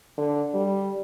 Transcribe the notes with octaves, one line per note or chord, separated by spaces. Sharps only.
D3
G3